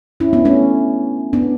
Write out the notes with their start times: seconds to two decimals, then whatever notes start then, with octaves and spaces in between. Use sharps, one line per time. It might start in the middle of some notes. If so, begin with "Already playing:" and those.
0.20 C#4 E4
0.33 B3 D4
0.45 A3 C#4
1.33 B3 D4